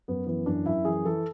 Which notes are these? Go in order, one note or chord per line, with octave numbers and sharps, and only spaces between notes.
F#2 B3
E3 B3
F#2 D4
F#2 E4
E3 G#4
E3 A4